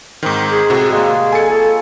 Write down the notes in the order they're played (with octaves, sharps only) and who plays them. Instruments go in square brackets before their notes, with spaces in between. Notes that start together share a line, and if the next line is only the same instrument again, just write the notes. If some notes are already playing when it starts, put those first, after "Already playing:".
[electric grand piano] G#2 D#3 [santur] C4 D#5 A#5
[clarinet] G#4
[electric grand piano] A2 C3 F#4
[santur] G3 G#3 A#3 [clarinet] G#4
[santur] G#3 [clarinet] A4 [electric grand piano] G#5 C#7
[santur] F4 C#5 [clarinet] A4